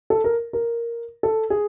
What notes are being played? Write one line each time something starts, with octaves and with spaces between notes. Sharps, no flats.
A4
A#4
A#4
A4
G#4